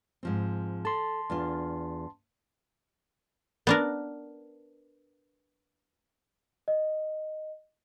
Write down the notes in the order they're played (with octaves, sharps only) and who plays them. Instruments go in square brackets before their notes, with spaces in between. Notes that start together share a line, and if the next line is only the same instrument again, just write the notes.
[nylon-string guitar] G#2 F3 C4
[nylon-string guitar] A4 [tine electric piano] A5 C6
[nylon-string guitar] E2 D4 F4
[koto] B3 D4 A#4
[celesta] D#5